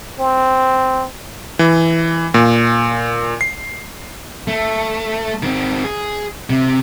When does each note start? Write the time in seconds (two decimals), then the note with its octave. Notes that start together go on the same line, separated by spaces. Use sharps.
0.19 C4
1.59 E3
2.34 A#2
3.41 C7
4.48 A3
5.43 D#3 C4
5.84 G#4
6.50 C3